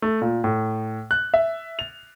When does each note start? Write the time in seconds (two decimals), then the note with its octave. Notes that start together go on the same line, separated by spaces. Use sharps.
0.02 A3
0.22 A#2
0.44 A2
1.11 F#6
1.34 E5
1.79 F7